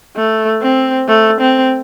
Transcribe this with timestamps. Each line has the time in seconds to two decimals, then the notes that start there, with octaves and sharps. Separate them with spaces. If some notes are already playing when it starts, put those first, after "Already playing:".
0.16 A3
0.62 C4
1.09 A3
1.40 C4